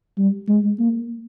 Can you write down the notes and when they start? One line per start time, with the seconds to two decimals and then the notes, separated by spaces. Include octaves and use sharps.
0.18 G3
0.48 G#3
0.79 A#3